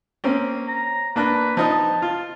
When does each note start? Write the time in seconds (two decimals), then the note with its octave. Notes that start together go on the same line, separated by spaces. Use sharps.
0.24 A#3 C4 C#4
0.68 A#5
1.16 A#3 D4 B4 F#6
1.57 F3 D#4 A5 D#6
2.02 F4